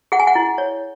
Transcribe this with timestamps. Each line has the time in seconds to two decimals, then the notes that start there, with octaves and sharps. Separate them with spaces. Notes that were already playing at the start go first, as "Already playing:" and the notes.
0.12 G#4 F#5
0.20 G#5
0.27 F#5
0.35 E4
0.58 C#5